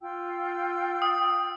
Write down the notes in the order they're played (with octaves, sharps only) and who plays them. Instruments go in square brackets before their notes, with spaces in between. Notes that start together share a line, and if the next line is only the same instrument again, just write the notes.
[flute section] F4 G5 E6
[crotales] D#6